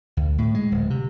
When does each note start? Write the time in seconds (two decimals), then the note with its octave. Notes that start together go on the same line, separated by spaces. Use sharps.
0.17 D2
0.38 A2
0.55 G#3
0.71 D1
0.90 C3